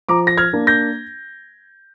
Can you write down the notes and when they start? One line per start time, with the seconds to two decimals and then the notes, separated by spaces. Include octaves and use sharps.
0.09 F3 A#5 D6
0.27 A#6
0.38 F6 G#6
0.53 A#3 D4
0.67 G6 A#6